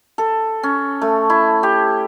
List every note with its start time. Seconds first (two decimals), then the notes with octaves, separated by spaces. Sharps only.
0.18 A4
0.63 C#4
1.02 A3
1.30 E4
1.63 G4